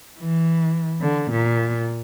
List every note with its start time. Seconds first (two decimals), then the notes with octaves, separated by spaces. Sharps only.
0.20 E3
1.01 D3
1.31 A#2